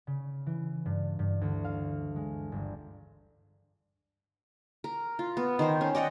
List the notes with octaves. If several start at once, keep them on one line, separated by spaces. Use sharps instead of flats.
C#3
E3
G2
G2
D2
F5
G#3
G1
A#4
F4
B3
D#3 C5
C#4
D5 D#5 F#5 G5